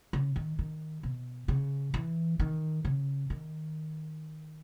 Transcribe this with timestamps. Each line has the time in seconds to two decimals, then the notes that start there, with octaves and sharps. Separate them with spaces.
0.13 C#3
0.36 D#3
0.59 D#3
1.03 B2
1.48 C#3
1.94 E3
2.39 D#3
2.85 C#3
3.30 D#3